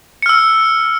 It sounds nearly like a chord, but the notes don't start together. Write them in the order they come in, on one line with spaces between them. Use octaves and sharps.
C#7 F6 E6